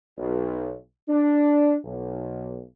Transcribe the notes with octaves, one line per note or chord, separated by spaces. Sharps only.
B1
D4
B1